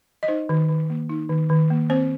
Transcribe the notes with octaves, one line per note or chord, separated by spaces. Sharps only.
D#5
D#4 C5
D#3
D#3
A#3
D#4
D#3
D#3
A#3
C4 C5